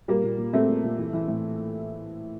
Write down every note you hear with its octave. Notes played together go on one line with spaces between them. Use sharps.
A#2 G3 A#3
A#2
A#2
A#2 A3 C4
A#2
A#2
E3
E3
A2